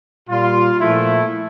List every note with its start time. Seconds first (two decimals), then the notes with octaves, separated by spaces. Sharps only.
0.28 A#2 G3 F4
0.80 A#2 F3 A3 E4